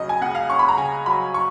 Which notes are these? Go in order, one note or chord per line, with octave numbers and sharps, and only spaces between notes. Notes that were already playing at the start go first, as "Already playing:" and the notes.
Already playing: C#2 C#3 F#3 C#4 D#5
G#5
C#2 F#5
F5
C#4 C#6
B5
A#5
C#3 G#5
F#3 B5
C#6